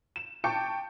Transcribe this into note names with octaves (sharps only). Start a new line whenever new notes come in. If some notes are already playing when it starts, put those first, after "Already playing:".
E7
G5 A5 C#6 D6 G6 C#7